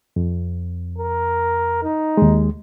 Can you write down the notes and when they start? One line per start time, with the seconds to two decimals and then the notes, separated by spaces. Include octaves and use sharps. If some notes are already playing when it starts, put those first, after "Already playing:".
0.16 F2
0.98 A#4
1.83 D#4
2.17 D#2 G#3